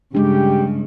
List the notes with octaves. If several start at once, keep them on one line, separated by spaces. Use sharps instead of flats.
G2 C#3 G#3 D4 G4